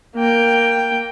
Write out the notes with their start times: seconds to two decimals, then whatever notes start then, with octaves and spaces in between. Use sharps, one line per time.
0.15 A#3 G5